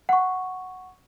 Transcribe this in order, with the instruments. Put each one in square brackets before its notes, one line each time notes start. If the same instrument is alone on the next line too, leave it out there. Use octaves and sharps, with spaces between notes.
[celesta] F#5 C#6